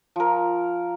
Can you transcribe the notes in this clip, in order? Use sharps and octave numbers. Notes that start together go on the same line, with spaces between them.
F3 A#4